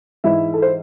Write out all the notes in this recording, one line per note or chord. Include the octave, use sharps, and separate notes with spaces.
G#2 E3 G#3 E4 E5
A4
C5